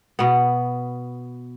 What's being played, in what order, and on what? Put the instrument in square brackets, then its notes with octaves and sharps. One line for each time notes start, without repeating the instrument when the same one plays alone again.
[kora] B2 B3